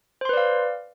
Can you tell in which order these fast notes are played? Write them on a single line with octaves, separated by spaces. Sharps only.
C5 C6 B4 D5 F5